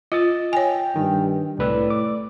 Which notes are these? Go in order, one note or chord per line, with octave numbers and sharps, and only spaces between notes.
F4 D#5 E6 A6
C#5 G5 G#5
G2 D#3
C2 A2 B4 D5 E6
D6